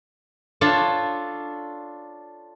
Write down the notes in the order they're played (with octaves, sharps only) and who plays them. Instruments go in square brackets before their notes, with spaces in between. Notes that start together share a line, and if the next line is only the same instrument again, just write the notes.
[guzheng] D4 F4 A4 C#5